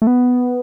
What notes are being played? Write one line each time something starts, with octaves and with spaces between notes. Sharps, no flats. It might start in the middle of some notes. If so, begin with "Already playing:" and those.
A3
B3